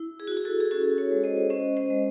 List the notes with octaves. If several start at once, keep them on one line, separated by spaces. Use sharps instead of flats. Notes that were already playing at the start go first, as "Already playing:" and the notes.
Already playing: E4
G#4
F#4
E4
G#4
F#4 A4
G#4
C#4 F#4 A4
A4 C#5
G#3
C5 D#5
C#4 C5 D#5
C5 D#5
G#3